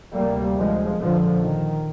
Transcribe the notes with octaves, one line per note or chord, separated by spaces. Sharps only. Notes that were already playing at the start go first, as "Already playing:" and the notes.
D2 C3 G3 A#3
F3 G#3
A#1 A#2 D3 F3
D#3